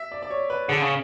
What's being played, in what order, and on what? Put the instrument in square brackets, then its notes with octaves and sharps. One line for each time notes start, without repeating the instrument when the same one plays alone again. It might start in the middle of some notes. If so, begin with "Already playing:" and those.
Already playing: [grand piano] E5
D5
D5
C#5
B4
[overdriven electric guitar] D3 [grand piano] G#4
[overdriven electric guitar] C#3